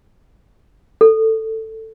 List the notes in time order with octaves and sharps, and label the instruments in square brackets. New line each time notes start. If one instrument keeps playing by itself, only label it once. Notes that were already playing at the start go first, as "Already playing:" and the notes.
[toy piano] A4